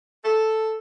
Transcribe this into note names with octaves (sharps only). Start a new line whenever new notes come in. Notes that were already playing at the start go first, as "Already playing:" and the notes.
A4